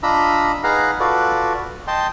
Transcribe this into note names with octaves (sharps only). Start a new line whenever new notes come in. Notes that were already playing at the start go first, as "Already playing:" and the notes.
D4 F4 D#5 A#5 B5 E6
D#4 G#4 B4 F5 F#5 A#5
F4 F#4 A4 B4 D5
D#5 G5 A5 C6